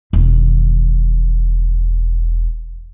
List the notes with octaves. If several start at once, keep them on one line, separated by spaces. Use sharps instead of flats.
E1 D#3